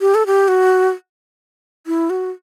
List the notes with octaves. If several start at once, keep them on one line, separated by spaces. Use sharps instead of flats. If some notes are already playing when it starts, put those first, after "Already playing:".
G4
A4
G4
F#4
E4
F#4